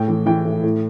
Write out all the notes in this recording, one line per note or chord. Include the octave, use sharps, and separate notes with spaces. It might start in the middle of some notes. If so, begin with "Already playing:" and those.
Already playing: A2 G5
E3
E3 G5
A2
A2